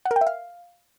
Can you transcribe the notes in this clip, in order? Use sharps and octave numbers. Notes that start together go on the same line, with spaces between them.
F#5
A#4
G5
E5
F5